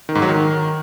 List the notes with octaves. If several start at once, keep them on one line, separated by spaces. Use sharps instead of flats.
D#3
G#2
F#3
D#3